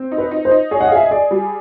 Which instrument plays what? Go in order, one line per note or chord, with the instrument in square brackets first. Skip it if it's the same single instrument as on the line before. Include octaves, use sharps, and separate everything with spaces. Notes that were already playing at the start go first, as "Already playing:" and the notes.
Already playing: [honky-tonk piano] C4
D#4
[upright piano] B4
[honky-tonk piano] D#4
[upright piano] C5
[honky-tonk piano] D#4
[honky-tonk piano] G#4 [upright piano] C#5
[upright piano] F#5
F5
[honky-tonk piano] G#4 [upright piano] E5
[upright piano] D#5
[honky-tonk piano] G#4 [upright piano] D5
[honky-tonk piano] G3